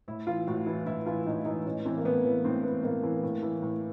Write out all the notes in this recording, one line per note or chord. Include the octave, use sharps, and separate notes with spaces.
A2 E4
E3 F4
A2 F#4
E3 E4
A2 E4
E3 F4
A2 D#4
E3 D#4
A2 C#4
E3 C4
A#3
A2 B3
E3
A2 C4
E3 B3
A2 A#3
E3
A2
E3
A2